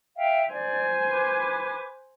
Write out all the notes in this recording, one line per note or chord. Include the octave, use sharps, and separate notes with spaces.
E5 F5 G5
C5 D5 G#5
B4 D6